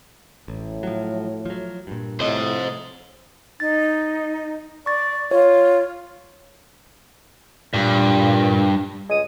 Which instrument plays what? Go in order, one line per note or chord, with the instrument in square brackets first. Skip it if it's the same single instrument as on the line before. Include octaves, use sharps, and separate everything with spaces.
[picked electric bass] A1 [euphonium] A2
[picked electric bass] F3 F#3
F3 F#3
G2 A#2
[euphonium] A2 [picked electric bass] C3 F3 [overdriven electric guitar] C5 D#5
[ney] D#4 [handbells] A6
[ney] D5 [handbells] C#6 A6
[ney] F4 [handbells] C#5
[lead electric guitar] G2 [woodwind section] A#2
[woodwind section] C#2 G#3 D#6